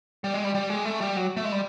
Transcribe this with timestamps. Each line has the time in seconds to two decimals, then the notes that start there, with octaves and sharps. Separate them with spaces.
0.24 G3
0.34 G#3
0.45 G3
0.55 G3
0.70 G#3
0.85 A3
1.01 G3
1.16 F#3
1.37 A3
1.45 G#3
1.52 G3